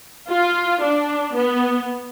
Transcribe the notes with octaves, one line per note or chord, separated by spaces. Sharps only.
F4
D4
B3